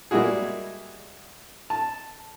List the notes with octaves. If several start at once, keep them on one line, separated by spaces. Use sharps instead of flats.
G3 G#3 A#3 E4 F#4 G#4
A5